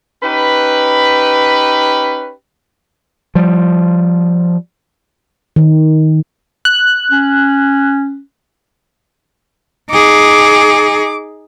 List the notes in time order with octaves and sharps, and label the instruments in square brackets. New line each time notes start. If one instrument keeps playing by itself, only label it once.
[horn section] C#4 D#4 G4 B4
[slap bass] F3 G3
[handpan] D#3
[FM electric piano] F#6
[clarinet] C#4
[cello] D#4 G#4 [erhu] D6